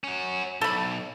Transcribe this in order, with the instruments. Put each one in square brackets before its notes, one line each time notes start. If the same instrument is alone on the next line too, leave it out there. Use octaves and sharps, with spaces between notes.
[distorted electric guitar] C#4 F#4
[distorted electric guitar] B1 [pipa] A4 B5